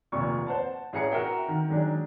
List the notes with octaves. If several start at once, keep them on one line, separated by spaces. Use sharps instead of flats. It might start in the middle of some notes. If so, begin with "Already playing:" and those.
F1 D#2 A#2 C#6
C5 F#5 A5
A1 C#4 G#4 F#5 A#5 C#7
F#4 A#4 E5 G5
D#3
D#3 F#3 G#3 D4